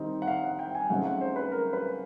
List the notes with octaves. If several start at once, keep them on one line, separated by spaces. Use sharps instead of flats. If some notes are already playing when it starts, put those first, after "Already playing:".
Already playing: D#3 G3 C4 D#4
F#5
F5
F#5
G5
G#5
C#3 F#3 A3 C4 D#4 F#5
F#5
C5
B4
A#4
B4